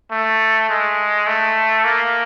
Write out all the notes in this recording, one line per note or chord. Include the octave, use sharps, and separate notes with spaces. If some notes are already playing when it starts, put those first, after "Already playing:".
A3
G#3
A3
A#3